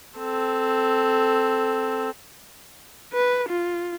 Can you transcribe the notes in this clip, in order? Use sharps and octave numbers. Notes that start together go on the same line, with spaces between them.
C4 A4
B4
F4